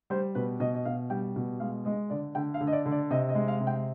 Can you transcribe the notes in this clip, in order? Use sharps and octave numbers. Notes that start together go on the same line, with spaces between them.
G3 C5
B2 B4
B2 D#5
D#5
B2 F5
G3 G5
B2
G#3 F5
G#3 D#5
D3 D5
D3 G5
F5
D3
D#5
D5
D3
D5
C3 D#5
D#5
G#3
F5
C3
G5